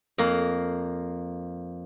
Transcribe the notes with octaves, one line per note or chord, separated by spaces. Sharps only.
F2 A#3 A#4